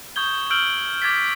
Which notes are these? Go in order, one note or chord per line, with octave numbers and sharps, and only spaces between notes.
C#6 D#6 G6 G#6 G7
E6 F6 G6 D7 F#7 G7
D6 G#6 A6 B6